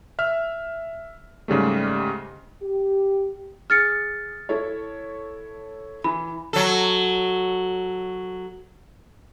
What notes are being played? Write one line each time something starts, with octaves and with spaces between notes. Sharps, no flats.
E5 F6
G#2 C#3 G3 A3
G4
G#4 F6 A6 C#7
E4 A4 C#5
E3 B5
F#3 A4